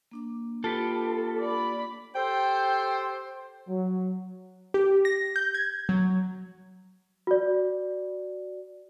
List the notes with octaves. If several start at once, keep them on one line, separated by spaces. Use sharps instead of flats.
A#3 D4 D6
F4 G4 A4 B4
D5 B5
G4 A4 C5 G5
F#3
G4
A#6
G6
G#6
F#3
F#4 D5